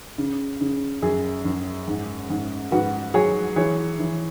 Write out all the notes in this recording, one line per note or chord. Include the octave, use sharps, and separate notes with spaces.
C#3
C#3
F#2 G#4
F#2
G#2
G#2
G#2 F#4 B4
F#3 G#4 C#5
E3 G#4 C#5
E3